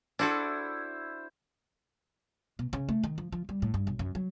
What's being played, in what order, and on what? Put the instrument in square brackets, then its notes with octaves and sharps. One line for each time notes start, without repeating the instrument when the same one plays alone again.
[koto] D4 F#4 A4 [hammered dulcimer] E4 C5
[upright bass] B2
C#3
A3
D#3
F3
F3
G3
A2
G2
B1
F#2
F#3